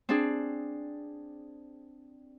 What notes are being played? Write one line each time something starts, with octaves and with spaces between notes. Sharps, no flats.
C4 D4 G#4